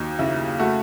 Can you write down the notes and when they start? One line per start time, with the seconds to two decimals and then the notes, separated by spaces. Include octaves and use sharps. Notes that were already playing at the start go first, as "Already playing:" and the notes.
Already playing: D#2 F#3 D#4
0.19 C#3 E4
0.59 A3 F#4